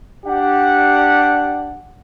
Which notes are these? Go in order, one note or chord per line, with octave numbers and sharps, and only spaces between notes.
D4 G4 F#5